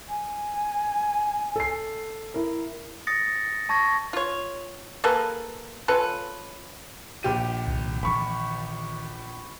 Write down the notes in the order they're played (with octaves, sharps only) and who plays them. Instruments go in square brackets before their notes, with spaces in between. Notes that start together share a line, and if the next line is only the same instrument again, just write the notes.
[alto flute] G#5
[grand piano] A4 C7
E4 A#4
[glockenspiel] D#6 A6 A#6 C#7
A5 C#6 G#6 A#6
[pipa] F4 C#5
A#3 G#4 A4 B4
C#4 F4 A4 B4
[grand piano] A#1 G4 D#7
[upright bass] C2 D#3
[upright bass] D#3 E3 [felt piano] B5 C#6